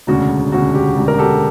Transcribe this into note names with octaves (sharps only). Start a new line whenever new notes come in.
E1 D2 C#3 F#4
E1 D2 C#3 F#4
G4
E1 D2 C#3
A#4
G4 A4